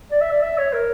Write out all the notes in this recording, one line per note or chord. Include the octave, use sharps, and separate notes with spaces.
D5
E5
D5
E5
C#5
A#4